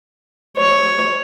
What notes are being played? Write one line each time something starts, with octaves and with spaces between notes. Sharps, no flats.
C#5